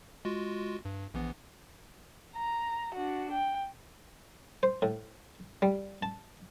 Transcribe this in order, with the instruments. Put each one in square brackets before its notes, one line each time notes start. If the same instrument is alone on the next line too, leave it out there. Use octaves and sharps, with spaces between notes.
[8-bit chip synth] G#3 F4 F#4
G2
A#1 E3 B3
[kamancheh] A#5
D4 F#4
G5
[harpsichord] C5
A2
G3
A5